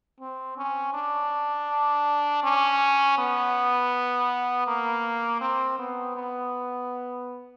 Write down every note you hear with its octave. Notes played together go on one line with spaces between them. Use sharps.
C4
C#4
D4
C#4
B3
A#3
C4
B3
B3